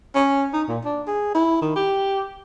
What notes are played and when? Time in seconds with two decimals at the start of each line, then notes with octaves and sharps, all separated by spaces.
0.15 C#4
0.54 D#4
0.69 A#2
0.85 D4
1.07 G#4
1.35 E4
1.62 D#3
1.76 G4